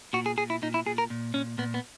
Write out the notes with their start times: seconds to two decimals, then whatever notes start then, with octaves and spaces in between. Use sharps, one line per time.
0.13 A#2 F#4
0.26 G#4
0.38 A#2 G#4
0.50 E4
0.62 A#2 D#4
0.74 E4
0.86 A#2 G#4
0.98 A#4
1.10 A#2
1.34 A#2 C#4
1.58 A#2 B3
1.74 B3